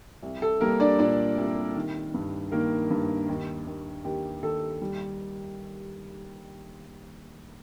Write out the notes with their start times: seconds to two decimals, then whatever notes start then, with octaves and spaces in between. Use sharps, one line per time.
0.23 C2
0.42 A4
0.61 G3 A#3 A#4
0.80 D4 D5
0.99 A#2 D4 D5
1.37 C2
1.75 D#3
2.14 G2
2.52 D#3 A#3 A#4
2.90 G2
3.28 D#2
3.67 D#2
4.04 D#2 G4
4.43 D#2 A4
4.81 G3